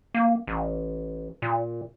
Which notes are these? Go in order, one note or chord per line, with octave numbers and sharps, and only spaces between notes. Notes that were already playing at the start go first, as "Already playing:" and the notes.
A#3
A1
A#2